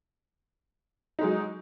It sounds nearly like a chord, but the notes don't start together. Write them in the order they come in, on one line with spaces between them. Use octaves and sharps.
D#4 G#3 F#3